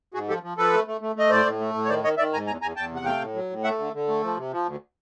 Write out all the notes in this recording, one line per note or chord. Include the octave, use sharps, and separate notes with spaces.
G#2 F#4 G#4
F3 G4 A4
F3
F3 A4 B4
A3
A3
A3
A3 D#5
A2 C5 D5
A2
A3
A2
C#5
D#3 C5 D5
D#3 C#5 D#5
D#3 D5 E5
G#2 G#5 A#5
E2 G#5 A#5
E2 G#5 A#5
E2 G5 A5
C3
F#5
A3 F5 G5
A2
F#3
A2
A3 E5 F#5
D3
D3
A3
F3
C3
F3
D2